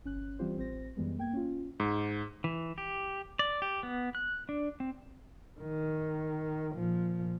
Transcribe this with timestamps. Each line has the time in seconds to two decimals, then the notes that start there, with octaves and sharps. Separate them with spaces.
0.04 G1 C#4 F#6
0.39 E3 G3 C4 F4 G4 C5
0.57 A1 C4 C5 A#6
0.96 F#2 E3 G3 G#3 B3
1.18 A#3 G5 G#6
1.33 C#4 F4
1.80 G#2
2.44 E3
2.78 G4
3.39 D5
3.62 G4
3.83 B3
4.15 F#6
4.49 D4
4.80 C4
5.61 D#3
6.75 A#2 F3